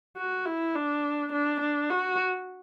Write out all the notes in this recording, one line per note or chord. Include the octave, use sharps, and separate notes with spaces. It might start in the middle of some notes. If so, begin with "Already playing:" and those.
F#4
E4
D4
D4
D4
F#4